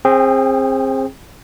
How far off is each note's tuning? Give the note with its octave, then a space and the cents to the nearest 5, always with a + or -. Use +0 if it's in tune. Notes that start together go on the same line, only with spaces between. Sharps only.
C4 +25 G#4 -15 G5 +0